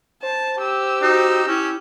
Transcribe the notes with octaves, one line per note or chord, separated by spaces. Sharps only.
C5 A5
G4 E6
D#4 F#4
C#4 E4